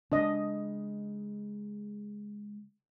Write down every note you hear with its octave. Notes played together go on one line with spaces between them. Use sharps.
C#3 G#3 D4 D#5